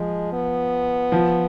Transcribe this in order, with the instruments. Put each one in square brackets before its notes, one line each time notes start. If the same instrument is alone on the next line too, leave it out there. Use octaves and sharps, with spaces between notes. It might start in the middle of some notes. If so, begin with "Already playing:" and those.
Already playing: [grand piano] F3 [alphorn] G#3
[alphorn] B3
[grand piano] F3